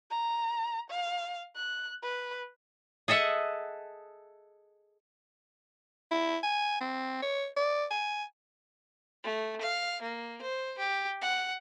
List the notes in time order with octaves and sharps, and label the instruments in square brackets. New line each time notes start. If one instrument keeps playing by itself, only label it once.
[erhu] A#5
F5
F#6
B4
[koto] G#4 A4 D#5 E5 F#5
[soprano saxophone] E4
G#5
C4
C#5
D5
G#5
[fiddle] A3
F5
A#3
C5
G4
F#5